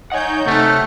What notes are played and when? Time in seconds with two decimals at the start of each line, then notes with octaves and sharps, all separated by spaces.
0.12 D#4 C#5 F#5 G#5 G6
0.46 C3 A3 F#5 F6